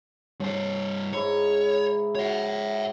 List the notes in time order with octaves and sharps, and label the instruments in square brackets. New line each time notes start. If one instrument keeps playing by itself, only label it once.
[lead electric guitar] G2 C5 [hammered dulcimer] C#5 A5
[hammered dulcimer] G#2 E4 A#5 [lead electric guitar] C#5
[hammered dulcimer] F#4 [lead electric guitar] C#5 E5